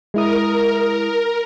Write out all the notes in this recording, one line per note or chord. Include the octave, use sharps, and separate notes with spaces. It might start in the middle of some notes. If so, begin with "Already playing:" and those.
G#3 E4 A#4 D#6